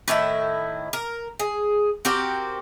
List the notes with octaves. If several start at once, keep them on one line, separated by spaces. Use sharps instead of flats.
A2 D#3 E4 E5
A#4
G#4
C4 F#4 G4 A#4